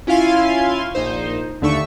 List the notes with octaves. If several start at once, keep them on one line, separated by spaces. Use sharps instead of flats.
C#4 E4 F4 F5 G#5 C6
A#1 D#4 C5
D#2 D3 A3 E5 C#6